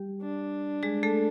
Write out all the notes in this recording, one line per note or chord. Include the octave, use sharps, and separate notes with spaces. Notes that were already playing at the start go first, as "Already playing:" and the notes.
Already playing: G3 G4
D4
G#3 G#4
A3 A4